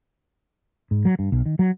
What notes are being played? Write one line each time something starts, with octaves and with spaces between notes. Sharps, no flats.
G#2
F#3
G2
B1
D#3
F#3